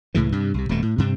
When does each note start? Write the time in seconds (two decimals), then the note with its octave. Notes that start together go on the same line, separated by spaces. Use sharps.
0.14 C#2 A2 C#3 E3
0.32 G2 C3
0.54 C2 C3
0.69 D#1 F2 B2 A3
0.82 A2
0.98 G2 C3 C4